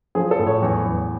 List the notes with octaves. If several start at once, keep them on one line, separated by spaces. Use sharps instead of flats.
F3 G#4
A4
A2
C#5
E2
E2